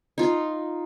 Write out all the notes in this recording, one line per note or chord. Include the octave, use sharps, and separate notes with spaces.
D#4 F4